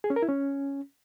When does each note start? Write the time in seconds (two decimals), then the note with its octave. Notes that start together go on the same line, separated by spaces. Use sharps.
0.04 G#4
0.10 C#4
0.16 A#4
0.22 E4
0.29 C#4